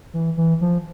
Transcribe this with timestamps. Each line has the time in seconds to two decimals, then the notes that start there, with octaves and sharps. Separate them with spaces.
0.14 E3
0.37 E3
0.61 F3